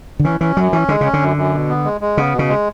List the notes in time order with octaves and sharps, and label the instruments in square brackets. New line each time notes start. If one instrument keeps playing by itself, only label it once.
[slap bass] D3
[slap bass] E3 [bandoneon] C#4
[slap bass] E3 [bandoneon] C#4
[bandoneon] F#2 [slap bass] F#3
[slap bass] E3 [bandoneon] C#4
[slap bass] D3 [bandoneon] G#3
[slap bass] C#3 [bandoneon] C#4
[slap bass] D3
[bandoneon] F#2
F#2
B2
B3
G#3
G#3
[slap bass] C#3 [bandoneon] B3
[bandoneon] B2
[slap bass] C#3
[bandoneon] G#3